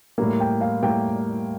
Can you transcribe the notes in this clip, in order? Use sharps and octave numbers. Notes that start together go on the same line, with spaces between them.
A2 G3 A#3
G5
F5
A2 G3 A#3 G5